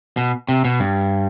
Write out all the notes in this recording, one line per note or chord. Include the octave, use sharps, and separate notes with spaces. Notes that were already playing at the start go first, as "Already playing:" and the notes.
B2
C3
B2
G2